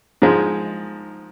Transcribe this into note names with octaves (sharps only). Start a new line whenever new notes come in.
G#2 F3 G#3